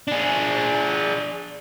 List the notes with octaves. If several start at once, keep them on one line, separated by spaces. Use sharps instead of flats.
D4 G#4